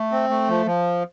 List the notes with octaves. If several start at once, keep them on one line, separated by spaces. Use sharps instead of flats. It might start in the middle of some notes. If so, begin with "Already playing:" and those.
Already playing: A3
C4
A3
F3
F3